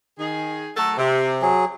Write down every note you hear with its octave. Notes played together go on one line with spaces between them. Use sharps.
D#3 G#4
F#3 A3 A4
C3
F#3 G#4